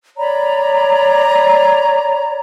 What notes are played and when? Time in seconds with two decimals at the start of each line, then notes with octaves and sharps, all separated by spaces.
0.18 C#5 D5 A#5 B5